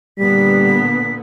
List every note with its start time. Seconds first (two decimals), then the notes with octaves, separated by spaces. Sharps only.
0.19 A#2 D3 G3 B3 B6